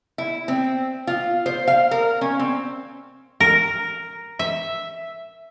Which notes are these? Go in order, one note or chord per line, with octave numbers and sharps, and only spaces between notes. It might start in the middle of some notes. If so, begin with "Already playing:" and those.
E4
C4
F4
C5
F5
A#4
C#4
C4
A#4
E5